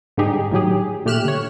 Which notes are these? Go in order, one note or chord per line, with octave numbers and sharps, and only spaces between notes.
G#2 D3 G3 D#4 G4 G#4
A2 D#3 F#3 G4 G#4
A#2 A3 G4 F6 F#6 E7
D3 C#5